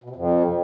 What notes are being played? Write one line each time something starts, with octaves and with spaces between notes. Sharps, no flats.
B2
C3
F2